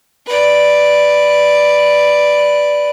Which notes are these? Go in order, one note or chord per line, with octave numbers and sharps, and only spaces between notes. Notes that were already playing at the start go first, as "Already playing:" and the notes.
B4 D5